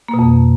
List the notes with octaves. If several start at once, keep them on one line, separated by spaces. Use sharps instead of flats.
A#3
B2
F2